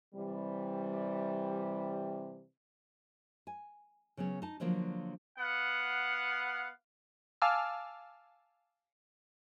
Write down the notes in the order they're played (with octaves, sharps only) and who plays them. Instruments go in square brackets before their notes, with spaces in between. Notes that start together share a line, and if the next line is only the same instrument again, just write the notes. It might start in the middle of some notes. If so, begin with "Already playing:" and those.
[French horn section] C3 E3 G3
[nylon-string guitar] G#5
C#3 F#3 B3 C#4
D#4 A5
D3 F3 F#3 A#3 D4 F#4
[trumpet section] B3 F5 F#5
[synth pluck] F5 G#5 A5 D6 E6 F6